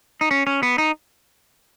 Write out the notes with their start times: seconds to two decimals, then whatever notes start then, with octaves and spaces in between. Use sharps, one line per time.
0.21 D#4
0.31 C#4
0.47 C#4
0.63 B3
0.78 D#4